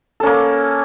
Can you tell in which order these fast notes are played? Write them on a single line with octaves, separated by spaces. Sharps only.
A4 C#4 A#3